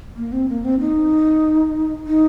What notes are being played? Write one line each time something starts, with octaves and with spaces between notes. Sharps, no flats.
A#3
C4
A#3
C4
D#4
D#4